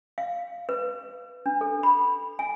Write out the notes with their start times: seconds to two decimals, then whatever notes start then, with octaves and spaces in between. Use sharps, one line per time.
0.18 F5
0.69 B4
1.46 D4
1.61 A4
1.83 B5
2.39 G#5